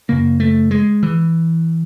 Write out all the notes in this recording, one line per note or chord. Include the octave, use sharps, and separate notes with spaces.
F#2 C#3 A#3
A3
G#3
E3